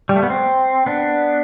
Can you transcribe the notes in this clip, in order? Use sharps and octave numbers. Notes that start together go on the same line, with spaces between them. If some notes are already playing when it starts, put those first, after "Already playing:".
G3
A3
B3
C4
B3 D4